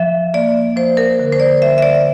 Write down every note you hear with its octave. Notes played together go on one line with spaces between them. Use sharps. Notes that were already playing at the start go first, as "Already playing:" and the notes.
Already playing: F3 E5
A#3 D5
F3 C5
A#4
D3
C5
D5
G3 E5
E5
D5